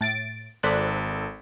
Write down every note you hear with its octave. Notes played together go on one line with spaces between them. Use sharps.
A2 A6 D7
G#1 A4 C5 D5 F#6 B6